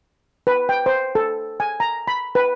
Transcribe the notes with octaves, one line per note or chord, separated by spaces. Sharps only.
B4
G5
C5
A4
G#5
A#5
B5
B4